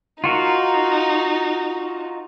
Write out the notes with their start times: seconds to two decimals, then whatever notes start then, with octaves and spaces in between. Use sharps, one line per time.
0.24 D#4 F4 F#4 A#4